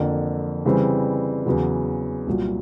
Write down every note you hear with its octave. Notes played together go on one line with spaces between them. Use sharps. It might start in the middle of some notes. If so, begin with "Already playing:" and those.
Already playing: F2 D3 F3 A#3
C#3 E3 G3 C4
E2 C#3 F#3
C2 A#2 F#3